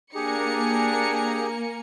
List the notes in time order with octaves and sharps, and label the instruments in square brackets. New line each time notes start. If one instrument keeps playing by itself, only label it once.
[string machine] A#3 [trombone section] D4 [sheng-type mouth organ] G4 G#4 [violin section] G#5 A#5 C#7